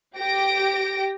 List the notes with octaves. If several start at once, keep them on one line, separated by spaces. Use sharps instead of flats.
G4 A#6 D7